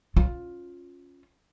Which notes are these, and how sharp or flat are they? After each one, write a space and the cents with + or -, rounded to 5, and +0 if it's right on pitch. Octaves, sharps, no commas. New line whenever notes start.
C#4 +0 F4 +10